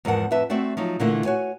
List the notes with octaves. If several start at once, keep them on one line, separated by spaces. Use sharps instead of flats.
E2 G#2 F3 A#4 F#5 A5
F2 A2 B4 E5 A5
A3 C4 F#4 D5 E5
F3 F#3 D#4
A#2 D3 E3 A3 A#3 E4
F#4 C#5 G#5